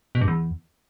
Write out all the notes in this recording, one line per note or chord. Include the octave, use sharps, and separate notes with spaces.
B2
G2
E2